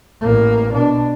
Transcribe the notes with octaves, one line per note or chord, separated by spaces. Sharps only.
A1 A#3
B2 D4